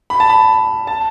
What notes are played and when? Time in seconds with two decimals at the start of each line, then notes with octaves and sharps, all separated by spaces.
0.10 B5
0.20 A5
0.30 B5
0.87 A5